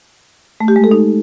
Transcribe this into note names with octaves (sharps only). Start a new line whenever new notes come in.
A3
G4
G#3
A4
D#4